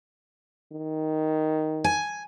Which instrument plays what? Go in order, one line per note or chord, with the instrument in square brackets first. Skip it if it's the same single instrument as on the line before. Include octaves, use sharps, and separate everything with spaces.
[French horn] D#3
[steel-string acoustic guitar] G#5